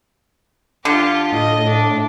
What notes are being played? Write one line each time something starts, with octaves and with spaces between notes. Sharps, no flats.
D3 F4 G4
A2 D#5
D4